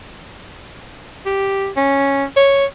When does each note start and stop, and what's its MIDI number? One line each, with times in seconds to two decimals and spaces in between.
1.26 1.70 67
1.77 2.24 61
2.37 2.65 73